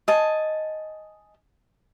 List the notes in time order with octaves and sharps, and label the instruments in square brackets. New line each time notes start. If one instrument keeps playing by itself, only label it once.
[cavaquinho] D#5 G#5 A5